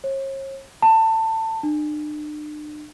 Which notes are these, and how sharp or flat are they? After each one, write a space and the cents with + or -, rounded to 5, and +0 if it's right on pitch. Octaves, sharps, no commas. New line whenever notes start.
C#5 -45
A5 +25
D4 +40